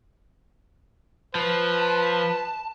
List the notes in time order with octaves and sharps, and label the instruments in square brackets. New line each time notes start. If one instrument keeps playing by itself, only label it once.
[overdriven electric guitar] F3 [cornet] B4 [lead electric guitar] A5